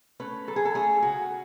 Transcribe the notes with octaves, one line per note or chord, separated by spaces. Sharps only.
A3 C#4 B4
F#3 A4
G#4
A4
A3 C#4 G#4
C#3 F#4